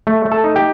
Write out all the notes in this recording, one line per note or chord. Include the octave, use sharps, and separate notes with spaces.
A3
A3
A4 A5
D#4
G4 G5